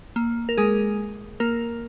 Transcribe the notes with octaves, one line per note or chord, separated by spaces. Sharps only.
A#3
A#4
G#3 G#4
A#3 A#4